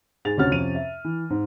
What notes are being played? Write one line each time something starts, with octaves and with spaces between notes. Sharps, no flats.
G#2 G#4 A6 F7
D2 C3 C#4 F#4 F6 A6
F2 C3 C#4 D#7 F7
E5
E3
G#2